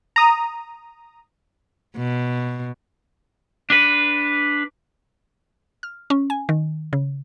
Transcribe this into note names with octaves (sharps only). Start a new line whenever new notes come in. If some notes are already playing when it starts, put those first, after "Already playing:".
A#5 D#6
B2
D4 B4
F6
C#4
G#5
D#3
C#3